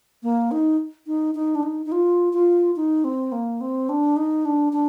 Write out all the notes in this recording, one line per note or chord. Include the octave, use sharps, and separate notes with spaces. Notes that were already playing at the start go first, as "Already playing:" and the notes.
A#3
D#4
D#4
D#4
D4
D#4
D#4
F4
F4
D#4
C4
A#3
C4
D4
D#4
D4
D4